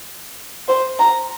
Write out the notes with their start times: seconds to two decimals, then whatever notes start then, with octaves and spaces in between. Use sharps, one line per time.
0.68 C5
0.99 A#5